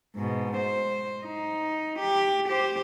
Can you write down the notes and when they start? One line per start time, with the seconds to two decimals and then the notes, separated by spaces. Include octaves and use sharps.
0.16 G#2 B2
0.57 C5
1.24 D#4
1.99 G4
2.48 G4 C5